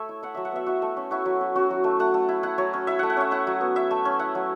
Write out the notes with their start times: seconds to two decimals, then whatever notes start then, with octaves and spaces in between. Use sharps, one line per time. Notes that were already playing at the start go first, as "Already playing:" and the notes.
Already playing: A3 C#5 E5
0.09 E4
0.23 E4 F#5
0.34 F#3 E5
0.45 F#5
0.52 B3 E5
0.67 E4 F#4
0.82 A3
0.97 C#4
1.11 E4 F#4
1.26 F#3
1.41 C#4
1.56 C#4 F#4
1.71 F#3
1.84 A3
1.99 A3 F#5
2.14 A3
2.29 E4
2.43 E4 F#5
2.58 F#3 C#5
2.73 C#4
2.87 E4 E5
2.99 A3 F#5
3.10 F#5
3.17 C#4 E5
3.31 E4 F#5
3.47 F#3
3.61 B3
3.76 E4 E5
3.91 A3
4.05 C#4
4.19 E4 F#5
4.35 F#3